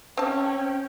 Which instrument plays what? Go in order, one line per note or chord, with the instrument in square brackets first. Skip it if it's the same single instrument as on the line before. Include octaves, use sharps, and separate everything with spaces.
[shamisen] C4 A5 [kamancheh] C#4 [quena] G5